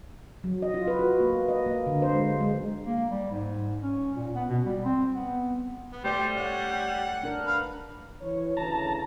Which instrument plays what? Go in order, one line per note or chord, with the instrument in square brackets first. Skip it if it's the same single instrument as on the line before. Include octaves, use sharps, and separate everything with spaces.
[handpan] F#3
D#5
F4
B4
F#4
A#3
D#5
A#3
D3
C5
G#3
G#3
[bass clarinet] A#3
G3
G#2
C#4
A#2
B3
B2
G3
C4
B3
[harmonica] B3
[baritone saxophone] G3 [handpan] A3 D5 [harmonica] C5
[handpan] C#5 [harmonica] F#5
[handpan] D4 A#4
[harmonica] B4 F5
[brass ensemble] E3 C#5
[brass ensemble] D2 C#3 E3 [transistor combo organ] A5 A#5